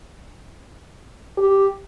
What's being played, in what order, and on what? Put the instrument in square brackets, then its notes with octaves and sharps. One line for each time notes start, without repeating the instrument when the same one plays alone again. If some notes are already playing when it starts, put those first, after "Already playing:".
[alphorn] G4